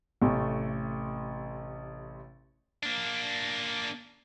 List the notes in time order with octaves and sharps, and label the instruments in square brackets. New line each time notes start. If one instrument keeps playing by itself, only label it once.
[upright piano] A1 C3 A3
[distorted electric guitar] A#3 D4